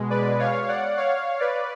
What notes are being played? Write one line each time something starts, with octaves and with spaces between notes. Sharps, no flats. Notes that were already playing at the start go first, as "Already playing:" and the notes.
Already playing: B2 G#3
B4 D5
C#5 F5
D5 F#5
C#5 F5
B4 D5